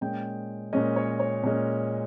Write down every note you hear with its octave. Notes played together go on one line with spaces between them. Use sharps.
A#2 G#3 C#4 G5
A#2 G#3 C#4 D#5
C#5
C#5
A#2 G#3 C#4